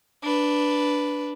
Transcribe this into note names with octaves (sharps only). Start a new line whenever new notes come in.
D4 B4